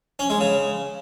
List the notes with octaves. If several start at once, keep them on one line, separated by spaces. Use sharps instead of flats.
C#4
G#3
C#3